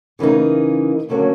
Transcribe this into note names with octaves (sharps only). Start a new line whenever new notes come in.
C#3 E3 G3 A#3 D#4
D#2 D3 F#3 A#3 C#4